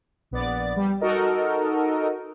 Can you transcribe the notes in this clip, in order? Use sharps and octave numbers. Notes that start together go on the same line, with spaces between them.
A#1 B3 D5 A6
G3
D#4 F#4 A4 A#4 D#5